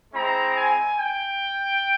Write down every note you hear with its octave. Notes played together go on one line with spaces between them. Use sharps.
G#3 C4 E4 A#5
G#5
G5